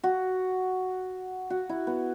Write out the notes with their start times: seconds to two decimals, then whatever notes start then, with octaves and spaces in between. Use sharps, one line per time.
0.03 F#4
1.50 F#4
1.69 E4
1.87 B3